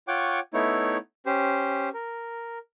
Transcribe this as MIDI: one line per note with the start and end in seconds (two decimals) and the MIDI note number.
0.08 0.40 65
0.08 0.40 73
0.08 0.40 78
0.08 0.40 79
0.08 0.40 85
0.08 0.40 86
0.54 0.97 57
0.54 0.97 59
0.54 0.97 63
0.54 0.97 64
0.54 0.97 73
1.26 1.89 61
1.26 1.89 67
1.26 1.89 72
1.94 2.59 70